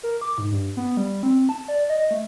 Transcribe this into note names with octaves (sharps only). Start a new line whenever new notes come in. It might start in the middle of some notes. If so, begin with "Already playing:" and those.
A#4
D6
G#2
G2
B3
G3
C4
A5
D5
D#5
A3